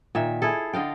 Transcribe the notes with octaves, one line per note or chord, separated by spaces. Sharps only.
A#2 D#3 E5
E4 G#4 A4
D3 D#5 F5 G5